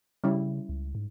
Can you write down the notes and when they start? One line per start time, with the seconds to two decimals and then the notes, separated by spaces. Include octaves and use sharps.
0.24 C#3 G3 C#4 E4
0.69 C#2
0.95 G#2